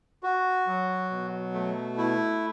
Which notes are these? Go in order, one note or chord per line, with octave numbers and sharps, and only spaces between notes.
F#4
F#3
B2
A3
E4